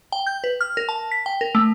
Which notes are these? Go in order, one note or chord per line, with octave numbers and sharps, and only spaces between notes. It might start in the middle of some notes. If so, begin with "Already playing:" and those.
G5
G6
B4
F6
A#4
A5
B6
G5
A#4
A3